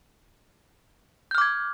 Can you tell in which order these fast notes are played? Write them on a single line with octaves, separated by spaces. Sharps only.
G6 F6 D6 G#6